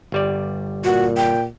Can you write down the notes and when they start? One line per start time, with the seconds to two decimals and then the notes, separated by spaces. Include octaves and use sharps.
0.12 G1 G3 D5
0.84 A#2 F#4
1.17 G5